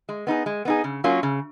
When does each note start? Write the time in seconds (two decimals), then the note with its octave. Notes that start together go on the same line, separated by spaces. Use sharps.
0.09 G#3
0.27 B3 D#4 G#4
0.46 G#3
0.65 B3 D#4 G#4
0.84 C#3
1.04 F#3 A#3 C#4 F4
1.23 C#3